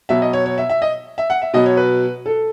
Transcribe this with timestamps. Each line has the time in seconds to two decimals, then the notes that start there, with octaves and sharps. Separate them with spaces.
0.09 B2 F#3 E5
0.22 D#5
0.33 C#5
0.46 C#5
0.58 E5
0.69 E5
0.82 D#5
1.18 E5
1.30 F#5
1.42 E5
1.54 B2 F#3 D#5
1.66 C#5
1.77 B4
2.26 A4